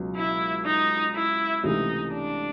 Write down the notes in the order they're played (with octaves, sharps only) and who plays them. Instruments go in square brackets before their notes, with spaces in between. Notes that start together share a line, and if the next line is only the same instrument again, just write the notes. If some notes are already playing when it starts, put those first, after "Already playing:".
Already playing: [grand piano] C#2 B2 F#3
[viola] E4
D#4
E4
[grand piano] C#2 C3 E3 A3 [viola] D#4
[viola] D4